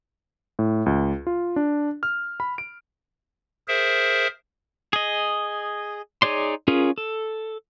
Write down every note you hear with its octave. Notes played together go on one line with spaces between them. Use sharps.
A2
C#2
F4
D4
F6
B5
D7
G#4 A#4 C5 E5
G#4 D#5
D#4 G#4 C#5 D5 C6
C#4 F4 G#4 A#4
A4